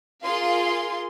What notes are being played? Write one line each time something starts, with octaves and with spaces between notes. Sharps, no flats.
F4 G#4 A#4 F5 C6